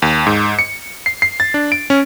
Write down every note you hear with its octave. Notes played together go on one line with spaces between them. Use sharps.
D#2
G#2
C#7
C7
C7
A6
D4
D7
C#4